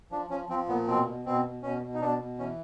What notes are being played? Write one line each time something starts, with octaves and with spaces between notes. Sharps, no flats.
F3 D4
F3 C#4
F3 C4
A#2 B3
B2 C4
B2
B2 C4
B2
B2 C#4
B2
D#4
B2 D4
B2
E3 C#4